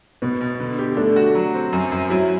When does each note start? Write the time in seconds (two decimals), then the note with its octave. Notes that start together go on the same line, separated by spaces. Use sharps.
0.22 B2 B3
0.41 B2
0.60 D3
0.79 G4
0.97 A3 D4
1.16 F#4
1.35 F#3
1.54 C4
1.73 F#2
1.92 F#2
2.10 F#3 E4